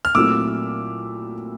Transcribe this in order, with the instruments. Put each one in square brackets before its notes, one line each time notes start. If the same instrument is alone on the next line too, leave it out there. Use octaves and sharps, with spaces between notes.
[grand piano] F6
[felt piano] A#2 F#3 A3 C4 E4 [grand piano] D6 E6